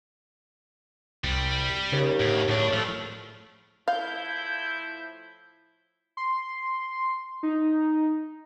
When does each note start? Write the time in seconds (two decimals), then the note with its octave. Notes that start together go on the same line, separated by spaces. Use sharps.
1.24 C2 G3
1.92 D#2 C#3
2.20 D2 A2
2.49 D2 A2 C#3 D4
2.73 F3 A3
3.88 A2 F3 E4 F5 G6
6.17 C6
7.43 D#4